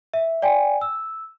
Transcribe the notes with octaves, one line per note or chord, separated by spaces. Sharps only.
E5
D5 G5 G#5
E6